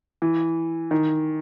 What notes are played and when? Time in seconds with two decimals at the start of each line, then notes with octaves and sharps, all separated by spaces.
0.22 E3
0.91 D#3